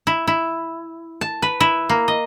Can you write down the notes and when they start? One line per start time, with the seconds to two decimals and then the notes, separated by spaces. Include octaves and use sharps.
0.07 E4
0.27 E4
1.21 A5
1.42 B4
1.60 E4
1.89 A#3
2.08 D#5